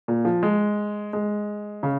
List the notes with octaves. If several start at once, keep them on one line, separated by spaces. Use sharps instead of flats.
A#2
F3
G#3
G#3
C#3